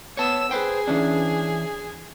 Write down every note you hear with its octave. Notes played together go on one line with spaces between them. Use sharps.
B3 C#5 A5 E6
G#4 B4 C5 G5
E3 C#4 D4